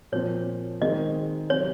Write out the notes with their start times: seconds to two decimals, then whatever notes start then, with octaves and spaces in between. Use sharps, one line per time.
0.12 A#2 F3 C4 C#5
0.82 D#3 G#3 C4 D#5
1.50 C3 F#3 C4 C#5